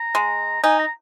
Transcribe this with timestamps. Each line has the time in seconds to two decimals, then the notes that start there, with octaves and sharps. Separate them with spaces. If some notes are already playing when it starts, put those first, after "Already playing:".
Already playing: A#5
0.15 G#3
0.64 D#4 G#5
0.79 A#5